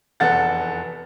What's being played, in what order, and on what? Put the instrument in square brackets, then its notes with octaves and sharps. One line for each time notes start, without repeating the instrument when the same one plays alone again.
[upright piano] F1 E2 A4 F#5 A6